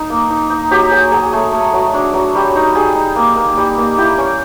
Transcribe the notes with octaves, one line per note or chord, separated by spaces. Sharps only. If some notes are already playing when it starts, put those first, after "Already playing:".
Already playing: D#4
A#3
D#4
D#4
F#3 G4
F#3 G#4
F#3 G#4
A3
A3
F#3
D4
F#3
G3
D#4
G3 G#4
D#4
A#3
A#3
G3
A#3
E4 G4
C#4